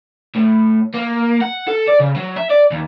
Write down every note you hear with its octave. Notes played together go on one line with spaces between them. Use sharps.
A2
A#3
F#5
A4
D5
C#3
F#3
E5
D5
D#2